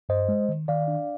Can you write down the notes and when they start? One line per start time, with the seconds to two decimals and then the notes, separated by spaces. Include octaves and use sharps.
0.09 G2 C5 D#5
0.29 G#3
0.49 D#3
0.68 D#3 D5 F5
0.88 D4